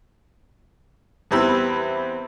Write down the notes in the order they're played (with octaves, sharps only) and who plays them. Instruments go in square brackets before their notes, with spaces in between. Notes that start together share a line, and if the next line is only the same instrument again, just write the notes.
[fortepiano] E2 G3 C4 E4 B4 E6